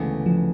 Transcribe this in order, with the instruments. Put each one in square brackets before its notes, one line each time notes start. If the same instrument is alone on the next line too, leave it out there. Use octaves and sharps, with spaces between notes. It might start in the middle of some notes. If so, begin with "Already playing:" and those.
Already playing: [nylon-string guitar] D2 C#3 E3 G#3 B3
[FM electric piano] F3